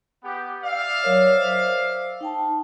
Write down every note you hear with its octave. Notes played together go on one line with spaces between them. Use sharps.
B3 G4
D5 E5 F5
F#3 A#4 C#5
C5
D#4 G5 A5